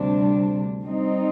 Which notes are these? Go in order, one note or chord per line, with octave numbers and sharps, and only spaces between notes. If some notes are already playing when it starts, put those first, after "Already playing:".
Already playing: D2 C3 G3 D4
G3 C4 D#4